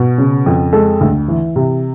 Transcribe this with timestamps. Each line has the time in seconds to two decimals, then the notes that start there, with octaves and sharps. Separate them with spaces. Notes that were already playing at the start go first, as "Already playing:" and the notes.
Already playing: B2
0.18 C#3
0.46 F2
0.73 G#3 A4
1.01 D2
1.28 E3
1.56 C3